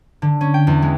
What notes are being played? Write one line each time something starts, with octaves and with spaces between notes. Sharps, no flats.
D3
C#4
G5
E2
G#3